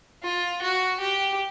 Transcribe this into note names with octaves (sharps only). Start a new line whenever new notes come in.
F4
F#4
G4